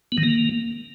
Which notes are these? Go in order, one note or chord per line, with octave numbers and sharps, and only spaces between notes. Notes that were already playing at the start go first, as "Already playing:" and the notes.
B3
D#3
A#3